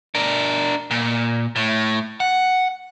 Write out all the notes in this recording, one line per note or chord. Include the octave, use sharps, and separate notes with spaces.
D4 A#4
A#2
A2
F#5